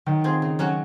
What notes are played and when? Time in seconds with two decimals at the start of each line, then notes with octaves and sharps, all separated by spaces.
0.06 D#3 F#3
0.24 C4 F4 G#4
0.42 C#3
0.59 F#3 C#4 F#4